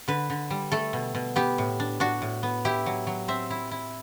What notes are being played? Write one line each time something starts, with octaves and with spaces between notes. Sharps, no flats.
D3 B4
D3
G3
A3 A4
B2
B2
B3 G4
A2
D4
D4 F#4
A2
B3
E4 G4
F#3
F#3
C4 E5
E4
E4